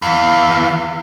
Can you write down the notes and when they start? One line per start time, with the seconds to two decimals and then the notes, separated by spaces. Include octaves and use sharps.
0.02 E2 E3 F5